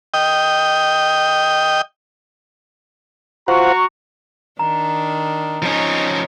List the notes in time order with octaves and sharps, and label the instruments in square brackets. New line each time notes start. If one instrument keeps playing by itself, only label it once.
[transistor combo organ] D#5 G5
[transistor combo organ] F4 C5 F#5 [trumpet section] F#4 A#5 C#6
[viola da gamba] D#3 D4 [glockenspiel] A#5
[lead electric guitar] F3 C#4 [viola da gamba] D#4 C#5